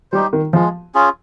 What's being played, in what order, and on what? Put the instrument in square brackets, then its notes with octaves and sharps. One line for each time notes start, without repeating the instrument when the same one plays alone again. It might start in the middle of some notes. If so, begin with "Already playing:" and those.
[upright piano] G3 [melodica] D#4 G4 C5
[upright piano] D#3
[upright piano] F3 [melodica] G#3
[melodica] C#4 F4 G#4